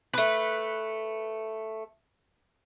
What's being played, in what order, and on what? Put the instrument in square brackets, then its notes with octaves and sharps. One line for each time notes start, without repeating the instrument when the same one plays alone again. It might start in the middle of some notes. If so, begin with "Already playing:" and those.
[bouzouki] A3 B4